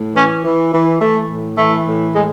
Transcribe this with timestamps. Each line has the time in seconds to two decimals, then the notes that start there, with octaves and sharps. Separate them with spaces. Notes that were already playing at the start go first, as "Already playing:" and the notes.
Already playing: A2
0.15 E3 C#4
0.44 E3
0.73 E3
1.01 E3 A3
1.29 A2
1.58 E3 A3
1.86 A2
2.14 A2 G#3